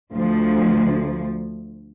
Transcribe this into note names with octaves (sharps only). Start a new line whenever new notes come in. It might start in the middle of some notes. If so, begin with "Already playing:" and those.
D2 F3